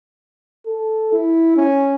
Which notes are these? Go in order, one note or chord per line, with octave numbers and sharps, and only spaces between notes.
A4
E4
C#4